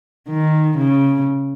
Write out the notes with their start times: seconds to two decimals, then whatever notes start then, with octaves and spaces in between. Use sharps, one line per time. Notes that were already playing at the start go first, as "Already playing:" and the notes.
0.29 D#3
0.78 C#3